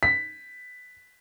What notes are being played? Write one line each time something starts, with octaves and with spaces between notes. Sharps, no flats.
B6